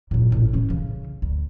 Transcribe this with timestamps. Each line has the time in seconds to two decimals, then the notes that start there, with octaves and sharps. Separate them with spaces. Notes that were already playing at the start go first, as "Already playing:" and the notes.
0.11 A#2 F#3
0.32 A1
0.53 E3 C#4
0.70 C#3
1.22 D2